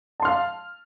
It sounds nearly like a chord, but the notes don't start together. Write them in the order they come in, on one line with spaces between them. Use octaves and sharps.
A5 C6 F6 F5